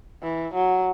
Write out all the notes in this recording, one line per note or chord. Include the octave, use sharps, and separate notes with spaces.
E3
F#3